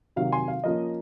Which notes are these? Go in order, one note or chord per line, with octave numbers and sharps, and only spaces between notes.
C3 D#3 F#3 F5
G#5 C6
F5
F3 A#3 C#4 D#5